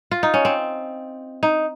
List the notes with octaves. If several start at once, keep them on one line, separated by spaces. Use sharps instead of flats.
F4
D#4
C#4
C4
D#4